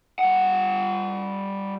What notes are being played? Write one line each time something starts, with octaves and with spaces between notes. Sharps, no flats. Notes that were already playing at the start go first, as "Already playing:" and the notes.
G3 F#5